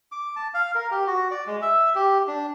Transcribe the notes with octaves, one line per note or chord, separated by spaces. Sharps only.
D6
A5
F5
A#4
G4
F#4
D5
G#3
E5
G4
D4